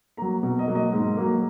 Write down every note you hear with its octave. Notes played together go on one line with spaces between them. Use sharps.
F#3 A#3 A#5
B2
D#5
F#3 A#3
D#5
G#2
F#3 A#3